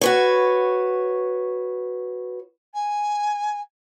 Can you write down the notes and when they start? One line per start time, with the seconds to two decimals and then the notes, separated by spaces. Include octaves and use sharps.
0.01 F#4 B4 C#5
2.74 G#5